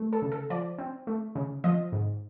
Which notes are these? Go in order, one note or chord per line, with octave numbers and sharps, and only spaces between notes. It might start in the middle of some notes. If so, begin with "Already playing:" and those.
Already playing: A3
A4
C#3
A4
F3 D5
C4
A3
C#3
F3 D#5
G#2